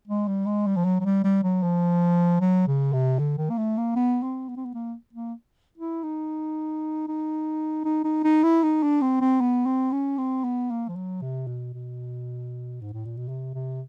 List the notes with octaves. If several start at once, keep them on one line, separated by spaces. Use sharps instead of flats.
G#3
G3
G#3
G3
F3
F#3
F#3
G3
G3
F#3
F3
F#3
C#3
C3
D3
D#3
A#3
A3
A#3
B3
C4
B3
C4
B3
A#3
A#3
E4
D#4
D#4
D#4
D#4
D#4
E4
D#4
D4
C4
C4
B3
C4
C#4
C4
B3
A#3
F3
F#3
C3
B2
B2
G#2
A2
A#2
B2
C3
C3